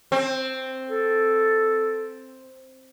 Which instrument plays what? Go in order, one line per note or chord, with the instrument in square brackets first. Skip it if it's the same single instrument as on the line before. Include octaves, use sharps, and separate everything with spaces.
[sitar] C4
[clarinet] A4